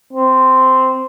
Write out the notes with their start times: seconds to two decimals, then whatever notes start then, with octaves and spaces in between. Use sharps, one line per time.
0.13 C4